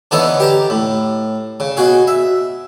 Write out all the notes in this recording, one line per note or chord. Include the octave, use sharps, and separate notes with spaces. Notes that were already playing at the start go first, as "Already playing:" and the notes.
D3 E3 B3 D#4 A4 C#5
G4 A5 A#5
A2
C#3
B2 F#4 G#4
E5